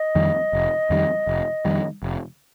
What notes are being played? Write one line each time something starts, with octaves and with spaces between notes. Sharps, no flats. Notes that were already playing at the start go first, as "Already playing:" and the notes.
Already playing: D#5
F2 D#3 G3
F1
F2 D#3 G3
F1
F2 D#3 G3
F1